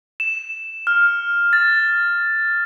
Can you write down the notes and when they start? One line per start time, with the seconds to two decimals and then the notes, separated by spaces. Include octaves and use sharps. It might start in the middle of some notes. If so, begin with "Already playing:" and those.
0.20 E7
0.87 F6
1.53 A6